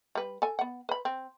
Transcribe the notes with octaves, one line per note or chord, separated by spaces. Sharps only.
G3 B4
A4 G#5
B3 F#5
B4 B5
C4